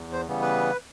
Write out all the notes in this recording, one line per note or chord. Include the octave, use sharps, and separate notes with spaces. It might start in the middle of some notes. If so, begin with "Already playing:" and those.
Already playing: E2
C5
C#3 E3 G3 B3
B4